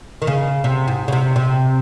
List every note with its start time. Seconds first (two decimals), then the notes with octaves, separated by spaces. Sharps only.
0.22 D#3
0.27 C#3
0.64 C3
0.88 G#2
1.08 C#3
1.12 C3
1.36 C3